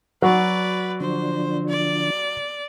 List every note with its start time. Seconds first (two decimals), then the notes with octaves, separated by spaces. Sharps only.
0.22 F#3 F#4 B4 D5
1.01 D3 F3 D4 C5
1.69 D5